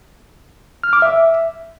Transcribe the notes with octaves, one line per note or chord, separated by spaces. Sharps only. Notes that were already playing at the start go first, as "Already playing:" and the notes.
F6
D6
E5